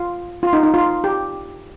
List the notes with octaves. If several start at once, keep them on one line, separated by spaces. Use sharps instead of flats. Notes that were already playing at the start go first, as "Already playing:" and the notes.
Already playing: F4
F4
D#4
D#4
F4
G4